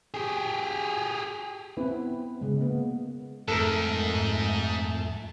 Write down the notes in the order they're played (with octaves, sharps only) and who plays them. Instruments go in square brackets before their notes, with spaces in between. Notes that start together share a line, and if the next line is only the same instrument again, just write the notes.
[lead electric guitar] G4 G#4
[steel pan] B3 C4 E4 B4
C#3 G#3
A#3 B3
[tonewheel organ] F2 A3 A5 [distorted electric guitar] G#2 [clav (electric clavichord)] A4 A#4